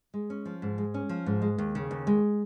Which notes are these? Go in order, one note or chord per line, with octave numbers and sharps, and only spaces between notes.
G#3
C#4
F3
G#2
G#3
C#4
F3
G#2
G#3
D#2
C#3
D#2
G#3